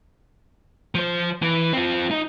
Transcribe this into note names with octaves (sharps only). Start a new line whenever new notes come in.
F3 C5
E3
C4 F4
D#4